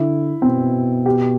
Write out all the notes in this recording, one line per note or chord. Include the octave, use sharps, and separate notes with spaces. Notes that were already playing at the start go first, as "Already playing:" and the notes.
Already playing: D3 E4
B2 C4
G4